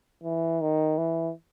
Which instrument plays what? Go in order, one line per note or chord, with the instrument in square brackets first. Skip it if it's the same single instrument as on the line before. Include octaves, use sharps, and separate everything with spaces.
[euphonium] E3
D#3
E3